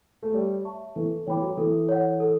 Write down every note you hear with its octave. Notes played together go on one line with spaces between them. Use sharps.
A3
G3 C#5
E5 A5 C#6
E3 A4
E3 C#5 G5 B5 D6
F#3
E3 A4
C#5 F#5
A4